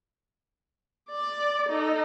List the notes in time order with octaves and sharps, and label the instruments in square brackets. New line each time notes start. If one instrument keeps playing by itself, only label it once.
[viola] D5 D6
D#4 A4